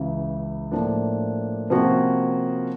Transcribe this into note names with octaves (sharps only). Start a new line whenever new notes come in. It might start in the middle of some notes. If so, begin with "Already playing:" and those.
Already playing: C#2 C#3 E3
A2 F3 A#3 D4
C3 F3 A#3 C#4 F#4